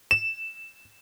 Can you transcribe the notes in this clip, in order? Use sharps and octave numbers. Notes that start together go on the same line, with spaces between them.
E7